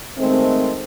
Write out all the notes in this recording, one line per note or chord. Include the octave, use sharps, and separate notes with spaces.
D#3 G#3 A3 C4